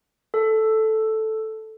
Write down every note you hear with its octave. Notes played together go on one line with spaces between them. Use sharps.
A4